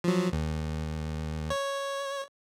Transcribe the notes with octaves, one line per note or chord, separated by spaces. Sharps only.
F3 F#3
D#2
C#5